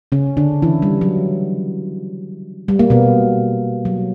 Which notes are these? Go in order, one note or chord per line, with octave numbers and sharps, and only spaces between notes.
C#3 C#4
D3 D4
E3 E4
G3
F#3
G3
A#3
B2 B3
F#3